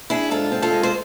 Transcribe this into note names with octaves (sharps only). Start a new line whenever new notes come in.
D4 E4 G#4
G#2 F4 A4
C4
F4 A4
G#3
C5